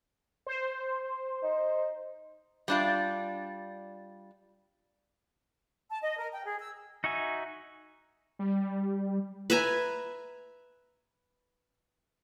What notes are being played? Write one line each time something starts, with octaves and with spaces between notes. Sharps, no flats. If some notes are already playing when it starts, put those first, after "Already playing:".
C5
D#4
G3 D4 F4
A5
D#5
A#4
G5
G#4
E6
D#4 F#4 E5 G#5
G3
B4 E5 G#5 A#5